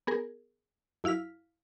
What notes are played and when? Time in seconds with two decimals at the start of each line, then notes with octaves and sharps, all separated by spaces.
0.07 B3 G#4 A#4
1.04 F#2 E4 F5 F6 B6